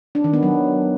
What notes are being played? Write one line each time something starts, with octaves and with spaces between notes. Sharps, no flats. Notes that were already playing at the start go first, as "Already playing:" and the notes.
D4
D#3
B3
F#3